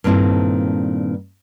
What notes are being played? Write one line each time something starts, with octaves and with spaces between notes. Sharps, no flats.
G2 A#2 D#3 C4 E4 A4